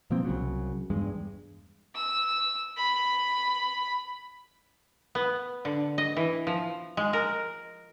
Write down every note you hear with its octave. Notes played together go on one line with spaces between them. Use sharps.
B2 F3 A#3 C4
C2 C#3 F#3
E2 G2 G#3
E6
B5
B3
D3
D#5
E3
F3
G#3
A#4